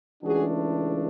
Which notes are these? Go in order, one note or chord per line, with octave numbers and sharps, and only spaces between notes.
C#2 C#3 E3 A3 D4 F#4 G#4